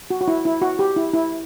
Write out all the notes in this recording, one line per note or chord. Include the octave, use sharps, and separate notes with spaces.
F#4
F#4
E4
E4
F#4
G4
E4
E4